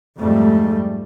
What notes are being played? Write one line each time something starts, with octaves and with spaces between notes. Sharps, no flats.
F2 G#2 G3 A3